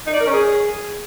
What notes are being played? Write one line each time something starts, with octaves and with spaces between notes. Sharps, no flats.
D#4
D5
A#4
C#4
G#4